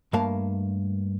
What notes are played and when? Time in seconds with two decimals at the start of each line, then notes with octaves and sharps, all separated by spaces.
0.13 G2 A3 A#3 A#4 F5 A5